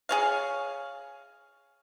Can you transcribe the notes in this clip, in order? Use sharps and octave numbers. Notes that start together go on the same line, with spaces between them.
G#4 C#5 F5